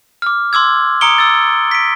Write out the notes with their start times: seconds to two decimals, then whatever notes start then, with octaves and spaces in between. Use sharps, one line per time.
0.22 D6 F6
0.53 C6 D6 E6 G#6
1.01 A#5 D#6 C#7 D7 G7
1.18 E6 A6
1.71 B6 D7